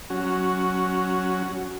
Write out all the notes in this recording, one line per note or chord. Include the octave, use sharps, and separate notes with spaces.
F#3 C#4 F#4